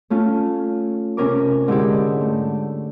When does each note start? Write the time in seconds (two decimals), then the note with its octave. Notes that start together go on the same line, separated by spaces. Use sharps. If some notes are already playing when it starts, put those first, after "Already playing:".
0.10 A3 C#4 F4
1.17 C3 C#4 A#4 D6
1.68 G#2 D3 E4 G4
2.21 A3